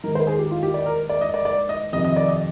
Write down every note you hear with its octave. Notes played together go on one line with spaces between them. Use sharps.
G#2 D#3 A#4
C5
G#4
G4
F4
G4
D5
A#4
D5
D#5
D5
D5
D#5
F2 C3 D#3 D#5
D#5
D5
D#5